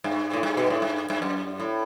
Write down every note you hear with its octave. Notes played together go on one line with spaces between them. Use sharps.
G2
A2
G2
B2
A2
G2
G2
F#2
A2